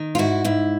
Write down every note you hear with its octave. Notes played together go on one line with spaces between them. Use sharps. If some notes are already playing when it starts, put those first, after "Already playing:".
Already playing: D#3
F4
G#2 E4 F#4
G#2 E4